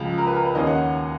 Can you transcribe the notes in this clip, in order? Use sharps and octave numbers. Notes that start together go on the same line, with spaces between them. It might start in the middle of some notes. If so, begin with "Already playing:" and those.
Already playing: C#2 C#3 F3
A#4
B4
A#4
B4
D#2 D#3 A#3 C#4 D#5
F#5